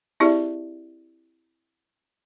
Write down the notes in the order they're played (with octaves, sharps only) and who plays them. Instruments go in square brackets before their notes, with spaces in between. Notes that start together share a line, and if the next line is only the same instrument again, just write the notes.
[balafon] C4 E4 G4 G#4 D5 E5